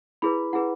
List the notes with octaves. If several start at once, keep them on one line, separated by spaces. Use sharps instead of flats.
E4 G#4 B4 B5
E4 G#4 B4 F#5